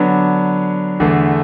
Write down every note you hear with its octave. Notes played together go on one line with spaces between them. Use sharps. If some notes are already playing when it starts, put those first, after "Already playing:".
Already playing: D3 F#3 B3 D4
E2 D3 A3